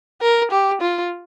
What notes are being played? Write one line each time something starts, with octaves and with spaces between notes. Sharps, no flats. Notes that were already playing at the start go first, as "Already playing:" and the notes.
A#4
G4
F4